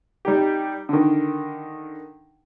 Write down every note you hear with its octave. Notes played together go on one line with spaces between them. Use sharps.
G3 D#4 G4
D3 D#3